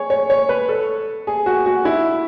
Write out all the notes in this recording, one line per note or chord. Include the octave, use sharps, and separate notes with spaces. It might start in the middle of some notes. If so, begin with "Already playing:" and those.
Already playing: G#4 C#5
C#5
C#5
B4
A4
G#4
F#4
F#4
E4